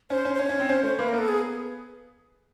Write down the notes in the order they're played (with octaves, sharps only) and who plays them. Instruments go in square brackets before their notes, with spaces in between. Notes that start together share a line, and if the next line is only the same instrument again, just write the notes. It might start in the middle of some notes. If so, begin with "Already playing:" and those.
[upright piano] C#4 [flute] C5
[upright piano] C#4
[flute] C5
[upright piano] C#4 [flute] C#5
[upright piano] C#4
C4
[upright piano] C#4 [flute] C5
[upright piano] A3 [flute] C5
[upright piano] A#3 [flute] B4
[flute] A#4
[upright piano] B3 [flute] A4
[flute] G#4